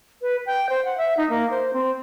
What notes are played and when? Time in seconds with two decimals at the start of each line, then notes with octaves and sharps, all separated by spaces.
0.22 B4
0.46 G5
0.69 C5
0.85 F#5
0.98 E5
1.17 D#4
1.30 A#3
1.50 C5
1.73 C4